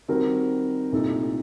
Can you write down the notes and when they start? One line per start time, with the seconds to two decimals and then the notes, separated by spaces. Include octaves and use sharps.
0.08 D#3 G3 C4 F#4 A#4
0.92 C2 A#2 A3 D#4 A4